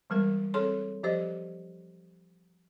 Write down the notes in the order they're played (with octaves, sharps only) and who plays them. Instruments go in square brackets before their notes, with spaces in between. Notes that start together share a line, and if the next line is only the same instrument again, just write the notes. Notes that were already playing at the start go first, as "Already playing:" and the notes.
[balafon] E3 G3 G#3 B3 A#4
C4 G#4 A4 C#5 C6
F3 G4 C5 D#5